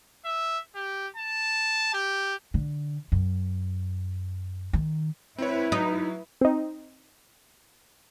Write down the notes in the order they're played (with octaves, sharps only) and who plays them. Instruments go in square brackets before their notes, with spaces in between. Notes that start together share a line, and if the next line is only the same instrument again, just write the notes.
[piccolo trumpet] E5
G4
A5
G4
[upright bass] D3
F#2
D#3
[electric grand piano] C4 C#5 [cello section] E4 B4
[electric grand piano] F#3 [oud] D#4
[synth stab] C4 D#4